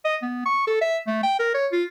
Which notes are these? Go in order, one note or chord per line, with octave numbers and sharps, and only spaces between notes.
D#5
B3
C#6
A4
E5
A3
G5
A#4
C#5
F4